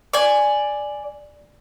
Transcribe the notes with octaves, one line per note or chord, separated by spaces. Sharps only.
D5 G#5